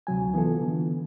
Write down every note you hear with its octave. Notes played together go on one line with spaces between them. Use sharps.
D2 C3 F#3 G#5
E3 B3 F4 A4
D3 E3 B3